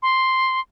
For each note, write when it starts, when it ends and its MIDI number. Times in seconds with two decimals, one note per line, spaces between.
0.02 0.60 84